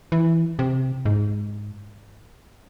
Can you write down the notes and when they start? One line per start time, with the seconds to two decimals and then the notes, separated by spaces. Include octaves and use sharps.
0.12 E3
0.59 C3
1.05 G#2